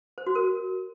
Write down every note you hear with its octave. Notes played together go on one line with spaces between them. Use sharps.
C5
F#4
A#4